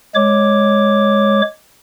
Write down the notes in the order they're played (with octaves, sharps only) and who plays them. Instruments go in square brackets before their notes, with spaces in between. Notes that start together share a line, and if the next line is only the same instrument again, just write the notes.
[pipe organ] G#3 C#5 D6